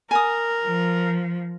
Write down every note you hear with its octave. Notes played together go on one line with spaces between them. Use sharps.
A#4 G#5 D#6
F3